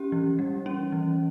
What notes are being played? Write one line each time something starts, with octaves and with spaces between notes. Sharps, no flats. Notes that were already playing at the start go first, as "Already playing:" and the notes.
Already playing: C#4 G4
E3
G3
C#4
E3